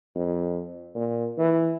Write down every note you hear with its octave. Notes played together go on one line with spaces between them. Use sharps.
F2
A#2
E3